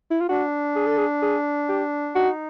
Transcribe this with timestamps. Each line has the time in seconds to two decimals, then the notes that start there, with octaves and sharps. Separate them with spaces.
0.11 E4
0.20 F4
0.29 D4 F#4
0.76 G#4
0.87 A4
0.98 G#4
1.22 G#4
1.69 G4
2.15 D#4 F#4